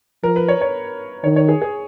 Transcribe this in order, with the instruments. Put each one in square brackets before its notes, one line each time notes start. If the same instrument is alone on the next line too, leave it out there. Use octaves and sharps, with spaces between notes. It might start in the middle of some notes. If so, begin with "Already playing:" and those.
[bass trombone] F3 [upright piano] A#4
[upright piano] B4
C#5
C#5
[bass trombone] D#3 [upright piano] C#5
[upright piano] C#5
G#4
G#4